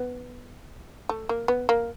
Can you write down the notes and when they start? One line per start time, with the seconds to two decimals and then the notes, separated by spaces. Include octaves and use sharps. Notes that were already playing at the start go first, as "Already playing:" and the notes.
Already playing: B3
1.09 A3
1.29 A#3
1.48 B3
1.69 A#3